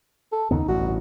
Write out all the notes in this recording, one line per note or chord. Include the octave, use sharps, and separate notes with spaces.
A4
D#2 C#3 B3 D#4
A1 G2 F#4